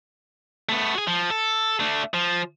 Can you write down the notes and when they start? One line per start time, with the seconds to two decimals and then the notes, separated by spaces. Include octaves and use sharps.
0.69 A3 B3
0.95 F#4 G#4
1.07 F3
1.30 A4
1.80 A3 D4
2.14 F3